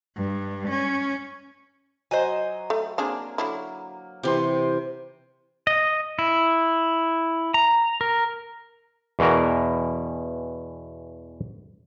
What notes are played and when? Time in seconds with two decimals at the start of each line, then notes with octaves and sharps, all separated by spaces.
0.16 G2
0.68 C#4
2.11 F#3 C5 D#5 G#5
2.70 A3
2.98 A#3 C4 D4 G#4
3.38 D3 F#3 E4
4.23 C3 E3 G4 C6
5.67 D#5
6.19 E4
7.54 A#5
8.01 A#4
9.19 E2 B2 E3 A#4